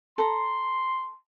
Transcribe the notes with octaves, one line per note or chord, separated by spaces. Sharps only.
A4 A#5 C6